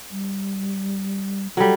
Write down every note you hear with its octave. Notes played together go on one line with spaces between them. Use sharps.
G3
F#3 G3 A4